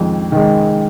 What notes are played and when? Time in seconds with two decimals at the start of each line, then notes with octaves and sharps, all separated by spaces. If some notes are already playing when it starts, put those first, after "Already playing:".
Already playing: F2 D#3 G#3
0.32 D#3 G#3